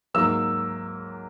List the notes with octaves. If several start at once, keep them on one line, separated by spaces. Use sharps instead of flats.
G#2 F#3 A#3 E6